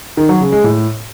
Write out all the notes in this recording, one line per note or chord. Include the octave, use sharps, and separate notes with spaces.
D#3
F#3
C#3
G#3
A2